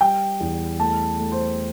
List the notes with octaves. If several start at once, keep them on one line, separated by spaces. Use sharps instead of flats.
G3 G5
E2
A3 A5
A3
C5